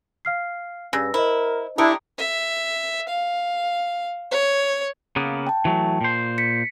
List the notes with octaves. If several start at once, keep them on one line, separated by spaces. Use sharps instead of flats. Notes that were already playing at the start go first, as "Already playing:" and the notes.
F5 F6 C7
G2 C#3 E6 A#6
E4 A#4 C5 D#5
A3 D4 E4 G4 A#5 D#6 C#7 D7
E5
F5
C#5
C#3 A#3 B3
G5 A5
E3 F#3 A3
A#2 C5
B6 C#7